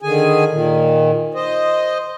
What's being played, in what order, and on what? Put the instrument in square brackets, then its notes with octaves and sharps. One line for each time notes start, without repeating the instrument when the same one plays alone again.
[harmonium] D3 D#3 G#4 G#5
A#2 D#3
C5 D#5